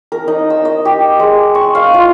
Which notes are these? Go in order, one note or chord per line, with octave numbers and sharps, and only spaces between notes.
A#4
D#4
E6
D#5
G4
G#3
C#6
F5
F4